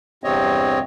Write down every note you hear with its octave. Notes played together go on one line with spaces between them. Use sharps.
E2 G2 C3 C4 C#5 D#5